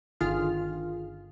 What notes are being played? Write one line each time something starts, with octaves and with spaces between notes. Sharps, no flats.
G1 D3 D#3 F4 G#4 F6